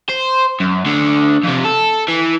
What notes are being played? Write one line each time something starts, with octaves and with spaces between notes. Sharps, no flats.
C5
F#2
D2 D3
F2 C3
A4
E3